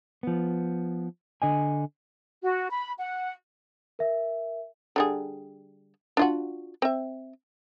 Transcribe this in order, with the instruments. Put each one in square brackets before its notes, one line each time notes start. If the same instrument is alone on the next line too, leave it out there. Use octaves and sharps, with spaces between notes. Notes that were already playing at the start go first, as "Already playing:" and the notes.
[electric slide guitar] F3 B3
D3 D#5 G#5
[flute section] F#4
B5
F#5
[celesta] A#4 E5
[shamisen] D3 G3 G#4
D4 F4 F#4
C4 E5